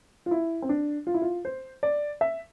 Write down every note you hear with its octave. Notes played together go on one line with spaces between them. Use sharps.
F4
E4
C4
D4
F4
E4
F4
C5
D5
E5